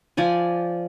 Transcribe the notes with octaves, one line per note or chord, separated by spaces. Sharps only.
F3 D5 G#5